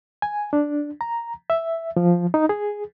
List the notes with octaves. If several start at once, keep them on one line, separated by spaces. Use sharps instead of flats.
G#5
D4
A#5
E5
F3
D#4
G#4